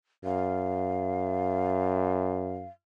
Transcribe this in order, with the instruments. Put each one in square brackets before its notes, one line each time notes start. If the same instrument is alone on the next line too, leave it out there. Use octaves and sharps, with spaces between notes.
[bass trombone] F#2 [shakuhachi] F5